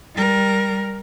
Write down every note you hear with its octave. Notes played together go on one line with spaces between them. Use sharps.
G3 A#4